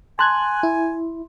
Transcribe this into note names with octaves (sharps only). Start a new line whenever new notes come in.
G#5 A5 C6 F#6 G#6
E4